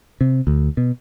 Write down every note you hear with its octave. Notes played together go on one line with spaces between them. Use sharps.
C3
D2
B2